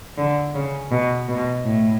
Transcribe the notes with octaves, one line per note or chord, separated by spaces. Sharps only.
D3
C#3
B2
B2
A2